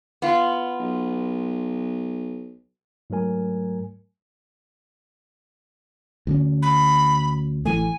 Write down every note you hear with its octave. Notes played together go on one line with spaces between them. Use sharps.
B3 F4
B1
G#2 F#3 A3 A#4 G#5
D2 D3 C#4
B5
A1 E3 A3 G#5